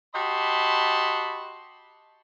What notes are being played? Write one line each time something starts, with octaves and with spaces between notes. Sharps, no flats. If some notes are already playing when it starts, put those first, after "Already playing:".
F#4 G4 D#5 A5 B5 C6